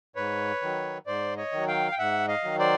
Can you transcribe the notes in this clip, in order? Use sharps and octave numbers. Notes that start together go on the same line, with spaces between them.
G#2 B4 C#5
D#3 F#3
G#2 C5 D5
C#5 D#5
D#3 F#3
F5 G5
G5
G#2 E5 F#5
D#5 F5
D#3 F#3
C5 D5